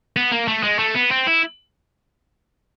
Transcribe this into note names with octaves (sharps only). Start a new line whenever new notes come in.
B3
A#3
A3
G#3
A3
B3
C4
E4